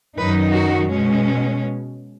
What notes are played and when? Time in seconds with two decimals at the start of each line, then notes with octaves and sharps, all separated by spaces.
0.17 F#2 D#3 F#3 D#4 B4
0.52 F#4
0.89 B2 G#3 C#4